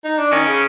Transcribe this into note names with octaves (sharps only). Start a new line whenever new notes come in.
D#4
D4
D#3 C#4
C#3